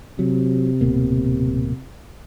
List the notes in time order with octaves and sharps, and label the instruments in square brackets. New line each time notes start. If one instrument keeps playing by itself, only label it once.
[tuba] C3 [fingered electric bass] F#3
[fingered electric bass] D1 B2 A#3